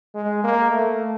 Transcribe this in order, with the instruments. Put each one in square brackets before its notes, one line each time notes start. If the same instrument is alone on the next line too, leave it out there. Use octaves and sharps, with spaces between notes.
[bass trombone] G#3
A#3
A3